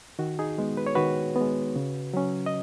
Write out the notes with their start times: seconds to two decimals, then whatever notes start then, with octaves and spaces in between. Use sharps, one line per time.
0.19 D#3 F#4
0.39 D#4 G#4
0.58 G#3 B3
0.77 B4
0.87 C#5
0.95 D#3 F#4 B4
1.36 G#3 B3
1.76 C#3
2.14 F#3 C#4
2.46 D#5